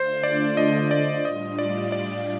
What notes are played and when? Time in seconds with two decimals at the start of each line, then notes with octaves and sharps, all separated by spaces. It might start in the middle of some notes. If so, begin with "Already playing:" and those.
Already playing: D3 A3 D4 F4 C5
0.23 D5
0.57 D#5
0.91 D5
1.25 A2 G3 D4 F4 D#5
1.59 D5
1.92 D5